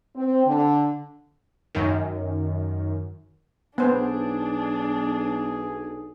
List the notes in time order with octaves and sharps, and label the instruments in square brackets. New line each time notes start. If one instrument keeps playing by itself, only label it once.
[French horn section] C4
D3
[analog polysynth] F#2 D#3
[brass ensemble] B1 [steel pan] B3 C5 [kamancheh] D4 [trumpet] G#4